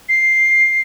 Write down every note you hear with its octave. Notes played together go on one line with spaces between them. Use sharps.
C7